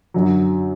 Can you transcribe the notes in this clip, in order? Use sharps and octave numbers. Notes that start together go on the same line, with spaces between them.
F#2 D3 F#3